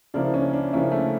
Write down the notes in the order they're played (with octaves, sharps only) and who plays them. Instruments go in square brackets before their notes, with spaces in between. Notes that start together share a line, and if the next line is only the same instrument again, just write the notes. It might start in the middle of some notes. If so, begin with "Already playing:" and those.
[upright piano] C#3 F3 A#3 E4 [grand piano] D4
[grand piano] C#4
D4
[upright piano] C#3 F3 A#3 E4 [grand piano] C#4
[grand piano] A3